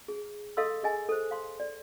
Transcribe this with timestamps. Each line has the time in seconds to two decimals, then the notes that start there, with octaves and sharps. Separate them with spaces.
0.08 G#4
0.57 A4 D#5 F5 C6 E6
0.83 G#4 D#5 G#5
1.09 A4 C5
1.31 F5 C6
1.60 D5